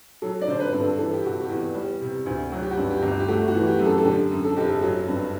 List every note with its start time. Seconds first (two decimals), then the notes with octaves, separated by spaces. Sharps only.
0.22 F#3 A4
0.41 D5
0.48 D3 C5
0.60 B4
0.73 G2
0.80 A4
0.98 E3 A4
1.13 G4
1.24 C3 F#4
1.40 G4
1.49 E2
1.75 G3
2.01 C3
2.26 D2
2.52 F#3 F#4
2.62 G4
2.71 F#4
2.78 G2
2.90 G4
3.03 G1
3.19 G4
3.28 A3 F#4
3.48 F#4
3.55 E3
3.67 G4
3.79 F#2
3.86 A4
3.98 A4
4.05 D3 G4
4.31 F#2
4.44 A4
4.57 F#1 G4
4.69 A4
4.82 F#3
5.08 G2